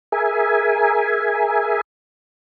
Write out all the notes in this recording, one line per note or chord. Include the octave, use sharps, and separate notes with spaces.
G#4 A#4 E5 G#5